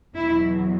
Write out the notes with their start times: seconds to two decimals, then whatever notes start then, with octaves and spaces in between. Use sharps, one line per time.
0.16 E2 B2 F#3 E4